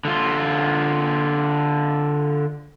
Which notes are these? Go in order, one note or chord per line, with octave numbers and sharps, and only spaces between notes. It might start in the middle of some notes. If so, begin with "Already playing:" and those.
D3 F4